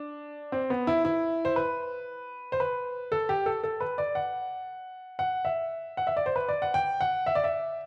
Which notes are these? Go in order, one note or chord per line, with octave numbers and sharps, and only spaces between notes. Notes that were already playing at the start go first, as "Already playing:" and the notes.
Already playing: D4
C4
B3
E4
E4
C5
B4
C5
B4
A4
G4
A4
A4
B4
D5
F#5
F#5
E5
F#5
E5
D5
C5
B4
D5
F#5
G5
F#5
E5
D5
E5